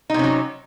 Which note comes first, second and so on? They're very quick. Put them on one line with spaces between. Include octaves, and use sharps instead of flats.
D#4 C3 C#4 F#3